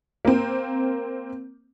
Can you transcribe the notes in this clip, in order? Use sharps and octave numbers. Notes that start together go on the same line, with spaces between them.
A#3 C4